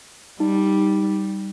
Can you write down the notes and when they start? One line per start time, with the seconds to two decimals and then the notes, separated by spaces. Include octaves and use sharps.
0.40 G3 D#4